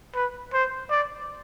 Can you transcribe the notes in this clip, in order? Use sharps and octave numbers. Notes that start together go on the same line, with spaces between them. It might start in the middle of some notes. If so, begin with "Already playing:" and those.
B4
C5
D5